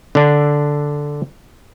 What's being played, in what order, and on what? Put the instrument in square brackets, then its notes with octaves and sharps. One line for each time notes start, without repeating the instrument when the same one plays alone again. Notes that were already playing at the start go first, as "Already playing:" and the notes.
[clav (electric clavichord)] D3 D4